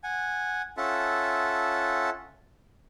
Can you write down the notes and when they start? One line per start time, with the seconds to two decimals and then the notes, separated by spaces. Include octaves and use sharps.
0.04 F#5 G#5
0.77 C#4 F4 A4 E5 F#5 A5